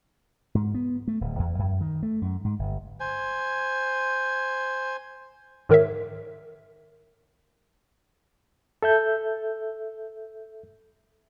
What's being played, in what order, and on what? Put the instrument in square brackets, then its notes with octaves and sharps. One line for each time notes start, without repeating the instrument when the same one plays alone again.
[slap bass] G#2
B3
A3
D1
E2
F#2
D#3
A3
F#2
G#2
G1
[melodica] C5 G#5
[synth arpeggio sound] G#2 D#3 A#4 C#5 E5
[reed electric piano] A4 E5 G6